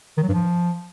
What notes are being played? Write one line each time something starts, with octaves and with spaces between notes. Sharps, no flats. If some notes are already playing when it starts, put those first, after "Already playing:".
D#3
F#3
G2
F3